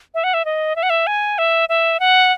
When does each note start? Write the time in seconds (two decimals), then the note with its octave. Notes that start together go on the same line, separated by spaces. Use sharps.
0.14 E5
0.24 F#5
0.34 E5
0.45 D#5
0.76 E5
0.83 F#5
0.90 E5
1.07 G#5
1.38 E5
1.69 E5
2.00 F#5